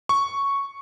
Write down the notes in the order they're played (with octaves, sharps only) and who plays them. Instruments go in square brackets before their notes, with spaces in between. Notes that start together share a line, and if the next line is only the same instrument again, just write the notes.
[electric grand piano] C#6